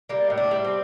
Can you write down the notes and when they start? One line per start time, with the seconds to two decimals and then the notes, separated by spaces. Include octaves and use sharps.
0.09 G3 A#3
0.30 A2
0.38 D4
0.51 G3
0.65 C4